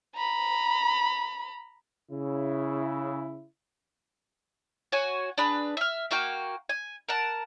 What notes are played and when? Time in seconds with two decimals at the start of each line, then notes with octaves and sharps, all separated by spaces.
0.15 A#5 B5
2.11 C#3 E4
4.92 F#4 C#5 F#5 G#5
5.38 D4 G#4 B4
5.77 E5 F6
6.11 A#3 F#4 F5 G5
6.69 G#5
7.08 A#4 F#5 A5